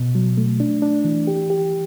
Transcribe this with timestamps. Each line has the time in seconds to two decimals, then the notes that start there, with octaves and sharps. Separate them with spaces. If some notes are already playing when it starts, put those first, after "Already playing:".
Already playing: B2
0.15 F#3
0.37 A3
0.60 D4
0.82 D4
1.04 E3
1.27 G4
1.50 G4